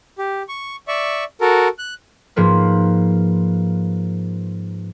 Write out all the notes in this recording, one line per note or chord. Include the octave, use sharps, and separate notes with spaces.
G4
C#6
D5 E5 C#6
F#4 A4 A#4
F#6
G#2 F3 A#3 B4